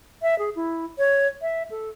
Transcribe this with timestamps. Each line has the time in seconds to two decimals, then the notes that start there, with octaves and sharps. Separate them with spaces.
0.22 E5
0.39 G#4
0.56 E4
0.98 C#5
1.42 E5
1.71 A4